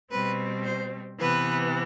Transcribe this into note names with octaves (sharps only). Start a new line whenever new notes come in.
B2 G3 C4 B4
C5
C3 E3 B3 B4